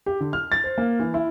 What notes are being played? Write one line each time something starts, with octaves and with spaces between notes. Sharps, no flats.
G4
D3
F6
A6
C5
A#3
E3
E4